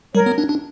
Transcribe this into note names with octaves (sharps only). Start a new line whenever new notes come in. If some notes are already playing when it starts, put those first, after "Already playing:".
G3 A#4 C#5
B3
D4
D4